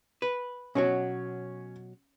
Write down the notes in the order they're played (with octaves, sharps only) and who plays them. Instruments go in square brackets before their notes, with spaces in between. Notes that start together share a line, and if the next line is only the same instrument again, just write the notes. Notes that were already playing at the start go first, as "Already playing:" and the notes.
[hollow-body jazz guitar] B4
[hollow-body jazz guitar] B2 F#3 F#4 [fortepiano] C#4 C#5